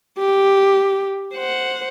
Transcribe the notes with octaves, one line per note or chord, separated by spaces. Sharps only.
G4
C5 F#5